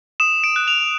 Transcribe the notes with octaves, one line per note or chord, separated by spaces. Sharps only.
D#6 E7
D7
F#6
F7